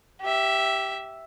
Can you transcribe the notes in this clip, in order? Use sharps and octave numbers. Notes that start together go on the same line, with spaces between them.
G4 E5